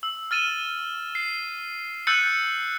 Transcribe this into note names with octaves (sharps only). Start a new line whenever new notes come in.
E6
F6 A6 D#7 E7
C7
E6 F#6 G6 A6 C#7 D#7